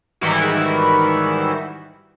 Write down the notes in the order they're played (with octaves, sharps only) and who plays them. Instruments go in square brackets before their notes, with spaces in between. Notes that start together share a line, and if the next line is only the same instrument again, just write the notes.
[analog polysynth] G#2 D#3 E3 G3 E4 F#4